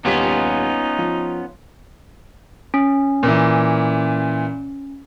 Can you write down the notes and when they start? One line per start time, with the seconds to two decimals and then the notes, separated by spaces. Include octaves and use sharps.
0.05 D#1 B3 C#4 D#4 F4 G4 B6
0.98 F3
2.74 C#4
3.23 A#2 E3